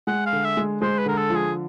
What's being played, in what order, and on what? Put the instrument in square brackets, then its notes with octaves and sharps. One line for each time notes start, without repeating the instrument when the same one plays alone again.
[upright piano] G#3 [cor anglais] F#5
[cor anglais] F5
[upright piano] D3
[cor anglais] E5
[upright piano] G#3
[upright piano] G#3 [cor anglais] C5
[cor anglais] B4
[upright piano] D3 [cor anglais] A#4
[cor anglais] A4
[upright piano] F3
[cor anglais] G#4